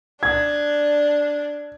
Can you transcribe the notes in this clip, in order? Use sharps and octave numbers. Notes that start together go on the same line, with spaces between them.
D4 G#6